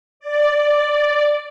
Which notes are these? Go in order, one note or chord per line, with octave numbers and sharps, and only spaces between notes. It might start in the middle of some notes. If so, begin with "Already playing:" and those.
D5